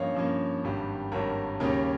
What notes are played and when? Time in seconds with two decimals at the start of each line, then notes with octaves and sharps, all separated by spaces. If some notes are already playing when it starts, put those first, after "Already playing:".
Already playing: G2 F3 A#3 C#4 C#5 D#5 F5
0.15 G2 F3 A#3 C#4
0.64 G#1 G2 G3
1.12 G#1 G2 G3 A#4 C#5
1.60 D#2 C#3 G3 A#3 C#4 A#4 C#5